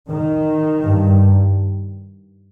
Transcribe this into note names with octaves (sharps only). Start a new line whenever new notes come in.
D#3
G2